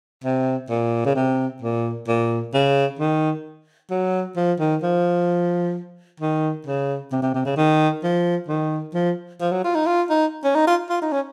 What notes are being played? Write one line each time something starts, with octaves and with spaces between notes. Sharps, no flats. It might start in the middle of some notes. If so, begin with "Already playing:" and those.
C3
A#2
C#3
C3
A#2
A#2
C#3
D#3
F#3
F3
D#3
F3
D#3
C#3
C3
C3
C3
C#3
D#3
F3
D#3
F3
F3
F#3
F4
D#4
F4
D#4
C#4
D#4
F4
F4
D#4
C#4